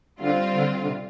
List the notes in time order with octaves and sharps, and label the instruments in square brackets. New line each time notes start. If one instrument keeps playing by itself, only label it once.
[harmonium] D3 [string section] G3 C4 F4
[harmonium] D3
D3
C3